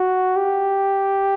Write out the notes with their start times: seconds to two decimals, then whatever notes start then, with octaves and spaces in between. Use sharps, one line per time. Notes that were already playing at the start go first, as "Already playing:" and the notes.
Already playing: F#4
0.36 G4